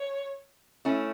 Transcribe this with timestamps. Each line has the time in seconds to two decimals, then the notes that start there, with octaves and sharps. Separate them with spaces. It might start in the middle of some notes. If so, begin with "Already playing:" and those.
Already playing: C#5
0.85 A3 C#4 E4